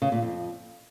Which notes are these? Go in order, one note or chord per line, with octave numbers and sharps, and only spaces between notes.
C#3
A#2
F2